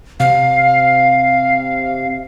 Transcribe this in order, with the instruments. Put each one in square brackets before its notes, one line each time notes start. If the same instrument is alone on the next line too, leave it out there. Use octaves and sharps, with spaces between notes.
[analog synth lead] C3 [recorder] F5